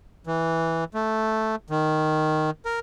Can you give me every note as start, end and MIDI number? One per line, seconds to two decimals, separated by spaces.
0.27 0.84 52
0.94 1.56 57
1.70 2.50 51
2.65 2.79 70